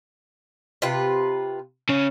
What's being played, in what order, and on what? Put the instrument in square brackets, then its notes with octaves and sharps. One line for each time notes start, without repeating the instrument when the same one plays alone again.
[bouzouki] C3 F4 B4
[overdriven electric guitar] C#3 C#4